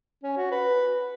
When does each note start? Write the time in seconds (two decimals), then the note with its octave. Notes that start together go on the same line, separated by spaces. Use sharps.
0.23 C#4
0.37 F#4
0.51 B4